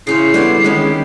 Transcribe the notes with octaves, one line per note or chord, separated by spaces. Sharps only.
C#3 C#4 E4 C5 C7
D3 G3 B3 C5 C#5
D#3 G3 G#3 B3 C#4